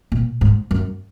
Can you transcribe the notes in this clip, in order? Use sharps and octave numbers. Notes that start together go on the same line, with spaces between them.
A#2
G#2
F#2